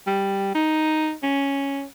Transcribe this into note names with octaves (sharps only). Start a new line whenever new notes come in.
G3
D#4
C#4